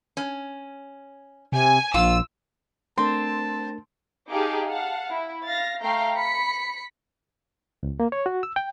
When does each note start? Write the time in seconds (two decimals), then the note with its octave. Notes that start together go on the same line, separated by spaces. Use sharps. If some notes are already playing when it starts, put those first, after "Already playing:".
0.17 C#4
1.52 C3 G#5
1.94 A#1 F4 E6
2.98 A3 C4 D4 A#4 A5 C6
4.29 D#4 G4 G#4 F5 A5 D6
4.67 F5 F#5 A5
5.11 E4
5.44 F5 A6 A#6
5.81 A3 F5 G5 A#5 C7
6.16 B5 B6 C#7
7.83 C#2
8.00 A#3
8.12 C#5
8.26 F#4
8.43 E6
8.56 G5